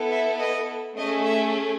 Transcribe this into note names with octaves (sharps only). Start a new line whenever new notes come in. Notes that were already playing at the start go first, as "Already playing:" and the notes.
Already playing: B3 E4 A4
E5
D#5
A3 C#4 G#4 D#5
E5